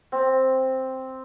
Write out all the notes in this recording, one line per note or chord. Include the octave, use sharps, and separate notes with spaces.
C4